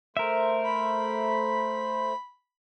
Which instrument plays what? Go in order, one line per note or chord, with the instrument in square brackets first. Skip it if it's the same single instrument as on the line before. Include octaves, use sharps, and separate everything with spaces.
[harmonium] A3 C5 [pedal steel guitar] A#4 E5
[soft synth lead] B5